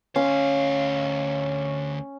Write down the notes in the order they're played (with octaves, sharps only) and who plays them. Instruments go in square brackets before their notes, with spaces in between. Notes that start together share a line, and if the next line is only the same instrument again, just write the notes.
[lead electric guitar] D2 F5 [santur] C#4